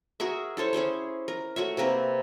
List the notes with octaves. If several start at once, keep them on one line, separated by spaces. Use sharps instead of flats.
F#4 G#4 A#4 E5
E4 A4 C5 C#5
C#4 G#4 C5 C#5
A#4
A3 F#4 C#5 E5
C3 A#3 A#4 B4